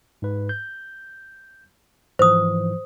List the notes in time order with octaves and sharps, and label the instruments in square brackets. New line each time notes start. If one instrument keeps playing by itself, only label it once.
[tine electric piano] G#2 B4
G6
[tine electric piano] G#2 E3 F3 [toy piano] C5 D#6